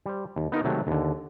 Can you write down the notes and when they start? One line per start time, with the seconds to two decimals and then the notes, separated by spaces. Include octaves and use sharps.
0.06 G3 C5
0.36 D#2
0.52 B3 D#4 F4 A#4
0.64 C3 D#3 F#3 G#3 A3
0.87 D#2 D3